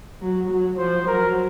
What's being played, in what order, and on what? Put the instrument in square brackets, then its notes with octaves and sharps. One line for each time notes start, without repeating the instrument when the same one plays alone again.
[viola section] F#3
F#3
[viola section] F3 [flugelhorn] C5
[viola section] F#3 [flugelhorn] A#4